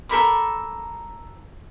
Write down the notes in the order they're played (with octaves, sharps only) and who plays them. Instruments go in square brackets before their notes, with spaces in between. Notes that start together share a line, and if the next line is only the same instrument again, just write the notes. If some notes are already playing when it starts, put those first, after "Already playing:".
[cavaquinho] A4 A#4 B5 D6